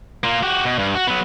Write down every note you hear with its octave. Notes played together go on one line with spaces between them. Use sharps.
A#3 F4
F#4 G4
B2
G2
F#4
F#3 B3